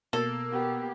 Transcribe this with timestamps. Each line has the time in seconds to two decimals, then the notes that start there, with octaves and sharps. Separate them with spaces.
0.13 B2 A#3 A4
0.51 B3 G4